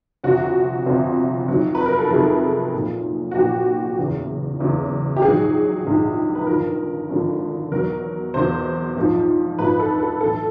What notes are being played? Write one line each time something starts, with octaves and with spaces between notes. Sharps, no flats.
G1 F2 C3 F#4
G1 F2 C3
F2 C3 D#3 F#3
B4
A#4
A4
F2 C3 D#3 F#3 G#4
B1 A#2 F3
F#4
B1 A#2 F3 G4
F#1 E2 C#3 E3
F#1 E2 C#3 E3
G4
A#1 G#2 D#3 F#3 G#4
A#1 G#2 D#3 F#3
B4
G#1 G2 D3 F3 A#4
G#1 G2 D3 F3
E2 B2 F#3 A#4
E2 B2 F#3 C5
A#1 G#2 F3
A#1 G#2 F3 B4
A4
A4
B1 A2 E3 A4